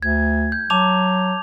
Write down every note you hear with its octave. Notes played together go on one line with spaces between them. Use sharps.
D2 G#6
G6
F#3 A5 D6 F7